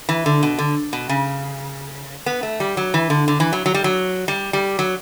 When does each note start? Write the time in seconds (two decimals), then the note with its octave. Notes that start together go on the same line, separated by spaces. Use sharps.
0.09 E3
0.26 D3
0.43 B2
0.58 D3
0.93 B2
1.09 C#3
2.26 B3
2.43 A3
2.60 G3
2.77 F#3
2.94 E3
3.10 D3
3.28 D3
3.40 E3
3.53 F#3
3.66 F#3
3.74 G3
3.84 F#3
4.28 G3
4.53 G3
4.79 F#3